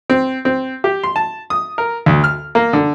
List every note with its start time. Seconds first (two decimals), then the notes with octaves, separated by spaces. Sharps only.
0.10 C4
0.45 C4
0.84 G4
1.03 C6
1.16 A5
1.50 D#6
1.78 A#4
2.06 D2
2.24 F6
2.55 A#3
2.73 D3